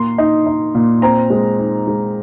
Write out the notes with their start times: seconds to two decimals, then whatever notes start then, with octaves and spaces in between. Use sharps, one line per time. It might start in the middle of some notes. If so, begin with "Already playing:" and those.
Already playing: A#2 A#3 C6
0.18 D#4
0.46 D#4
0.75 A#2
1.02 C4 A#5
1.30 G#3
1.58 D#4
1.88 G#3